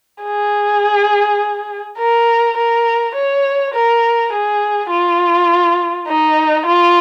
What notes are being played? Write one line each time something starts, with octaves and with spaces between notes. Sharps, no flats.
G#4
A#4
A#4
C#5
A#4
G#4
F4
D#4
F4